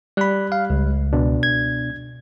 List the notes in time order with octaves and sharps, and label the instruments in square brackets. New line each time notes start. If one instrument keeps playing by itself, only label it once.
[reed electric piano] G3 F#6 [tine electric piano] D5 B5
[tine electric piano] F5
C#2
[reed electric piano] B2 D4
[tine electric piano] G#6